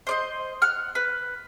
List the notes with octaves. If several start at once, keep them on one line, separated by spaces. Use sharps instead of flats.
C5 D5 D#5
F#5 F6
B4